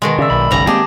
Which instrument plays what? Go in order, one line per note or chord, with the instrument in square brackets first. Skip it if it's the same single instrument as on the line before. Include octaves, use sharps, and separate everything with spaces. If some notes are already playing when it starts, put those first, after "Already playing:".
[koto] B2 D#3 G#3
[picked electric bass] C#3 [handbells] D5 E5 E6
[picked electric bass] B1 [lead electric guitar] B5
[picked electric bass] F#1 B1 C#3 [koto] G3 A#5
[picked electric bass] G#3 A#3 C4 [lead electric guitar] G4 [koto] G#4 [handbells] A5 D6